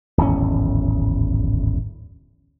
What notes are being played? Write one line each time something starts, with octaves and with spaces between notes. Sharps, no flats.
D1 G#1 E2 C#4